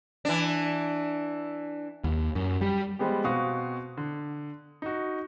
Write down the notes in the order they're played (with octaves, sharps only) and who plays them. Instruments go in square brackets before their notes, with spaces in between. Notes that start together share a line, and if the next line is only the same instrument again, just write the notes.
[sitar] E3 D4
[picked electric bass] D#2
F#2
G3
[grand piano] F3 G3 G#3 B3 G4
B2 C4 F#4 F5 C#6 D#6
D3
D#4 F#4